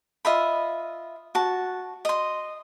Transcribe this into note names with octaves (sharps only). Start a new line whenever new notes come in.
F4 D#5 E5 B5
F#4 A5
D#5 C6